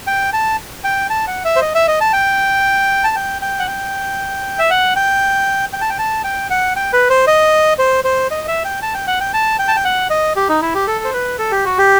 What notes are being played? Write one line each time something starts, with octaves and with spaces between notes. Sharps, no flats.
G5
A5
G5
A5
F#5
E5
C5
D#5
E5
D#5
A5
G5
A5
G5
G5
F#5
G5
E5
F#5
G5
G5
A5
G5
A5
G5
F#5
G5
B4
C5
D#5
C5
C5
D#5
E5
G5
A5
G5
F#5
G5
A5
G5
A5
G5
F#5
D#5
G4
D#4
E4
G4
A4
C5
B4
A4
G4
F#4
G4